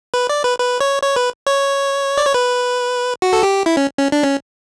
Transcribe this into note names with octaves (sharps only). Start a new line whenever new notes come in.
B4
D5
B4
B4
C#5
C#5
B4
C#5
D5
C#5
B4
F#4
A4
G4
E4
C#4
C#4
D4
C#4